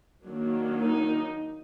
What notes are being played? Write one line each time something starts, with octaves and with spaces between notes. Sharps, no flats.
D#3 F#3 A#3 D4
D#4